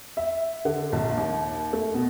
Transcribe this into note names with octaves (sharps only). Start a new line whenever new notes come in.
E5
D3
A#1
D#2
A3
B2